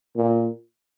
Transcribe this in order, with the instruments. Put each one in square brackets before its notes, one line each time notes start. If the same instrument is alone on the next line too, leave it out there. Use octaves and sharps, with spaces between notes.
[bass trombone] A#2